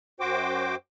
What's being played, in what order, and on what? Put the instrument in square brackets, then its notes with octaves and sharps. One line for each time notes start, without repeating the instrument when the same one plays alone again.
[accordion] F#2 F#4 C5 G5 D6